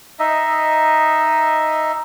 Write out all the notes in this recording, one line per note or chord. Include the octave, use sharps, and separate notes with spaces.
D#4 D#5 E5